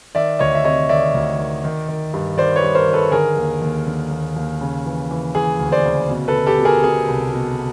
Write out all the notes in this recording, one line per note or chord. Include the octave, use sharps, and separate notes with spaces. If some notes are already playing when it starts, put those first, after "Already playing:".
D#3 D5 E5
D2 C#5 D#5
E5
C3 C#5 D#5
D#3 D5 E5
D2
D#3
D#3
D#3
G2
D#3 C5 D5
B4 C#5
G2
A#4 C5
D#3
A4 B4
D3 G#4 A#4
D#2
D#2
D3
D#2
D#2
C#3
E3
E3
E3 G#4
D2
C5 D5
C#3
B2
A4 B4
B2
G4 A4
B2
G#4 A#4
B2 G#4
C2
B2